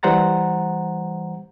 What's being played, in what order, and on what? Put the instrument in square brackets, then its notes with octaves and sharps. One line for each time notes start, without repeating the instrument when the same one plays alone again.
[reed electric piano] E3 G3 C5 F#5 A#5 A6